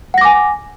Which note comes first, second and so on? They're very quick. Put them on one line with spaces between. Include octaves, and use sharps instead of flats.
F#5 A#6 D6 G#5